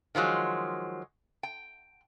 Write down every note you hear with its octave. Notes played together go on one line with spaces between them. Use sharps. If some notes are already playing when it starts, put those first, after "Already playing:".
D#3 F3 F#3 G#3
G5